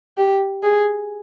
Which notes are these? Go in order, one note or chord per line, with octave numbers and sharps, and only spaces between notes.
G4
G#4